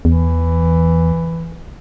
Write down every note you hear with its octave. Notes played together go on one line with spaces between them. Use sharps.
E2 E3